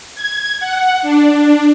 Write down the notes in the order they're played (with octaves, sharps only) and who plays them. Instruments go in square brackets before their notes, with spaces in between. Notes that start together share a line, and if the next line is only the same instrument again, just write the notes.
[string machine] G#6
F#5
D4